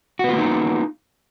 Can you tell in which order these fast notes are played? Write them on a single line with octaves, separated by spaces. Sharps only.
F#4 B3 F4 A#3 D#4